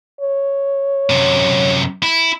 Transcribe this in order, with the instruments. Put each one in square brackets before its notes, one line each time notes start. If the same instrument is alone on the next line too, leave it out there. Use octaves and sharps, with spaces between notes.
[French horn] C#5
[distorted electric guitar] F#2 C3
E4